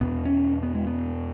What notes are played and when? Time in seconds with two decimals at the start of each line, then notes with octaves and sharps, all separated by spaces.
0.01 E2 B2 B3
0.25 C#4
0.63 B3
0.75 G#3
0.87 B3